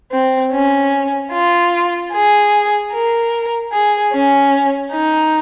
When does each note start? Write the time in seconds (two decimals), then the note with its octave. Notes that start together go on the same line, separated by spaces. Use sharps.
0.12 C4
0.53 C#4
1.32 F4
2.13 G#4
2.93 A#4
3.72 G#4
4.12 C#4
4.92 D#4